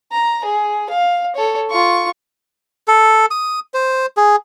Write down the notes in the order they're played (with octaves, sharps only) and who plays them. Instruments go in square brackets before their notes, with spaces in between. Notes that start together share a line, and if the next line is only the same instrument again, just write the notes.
[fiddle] A#5
G#4
F5
A4 C#5
F4 C#6
[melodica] A4
D#6
C5
G#4